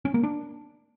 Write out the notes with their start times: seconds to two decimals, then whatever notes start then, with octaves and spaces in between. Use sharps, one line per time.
0.05 C#4
0.14 A#3
0.23 D4